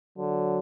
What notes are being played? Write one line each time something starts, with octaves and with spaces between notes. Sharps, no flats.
D3 F#3